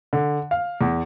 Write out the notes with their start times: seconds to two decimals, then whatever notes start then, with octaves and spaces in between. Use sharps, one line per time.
0.13 D3
0.51 F5
0.81 E2